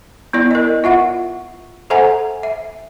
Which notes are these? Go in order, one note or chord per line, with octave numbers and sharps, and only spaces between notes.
B3 E4 D5
A#4 D#5
F4 E5 F#5
A4 C5 E5 F#5 G#5 A#5
E5